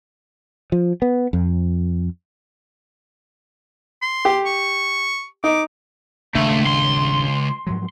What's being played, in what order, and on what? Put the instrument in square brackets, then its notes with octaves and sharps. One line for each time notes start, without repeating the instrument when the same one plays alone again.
[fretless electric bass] F3
B3
F2
[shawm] C6
[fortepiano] G4
[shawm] C#6
[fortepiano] D#4 [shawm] D6
[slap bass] D#1 G#1 D4 [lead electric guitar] C#2 [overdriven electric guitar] A3
[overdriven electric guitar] C6
[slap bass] G#2 F3 F#3